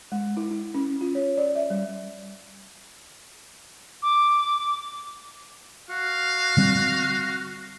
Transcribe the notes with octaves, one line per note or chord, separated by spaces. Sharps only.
G#3
E4
E4
C#4
F4
C#5
D5
E5
G3
D6
F#4 F5
D3 G3 C4